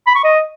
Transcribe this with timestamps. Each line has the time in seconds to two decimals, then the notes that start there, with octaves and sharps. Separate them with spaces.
0.07 B5
0.16 C#6
0.24 D#5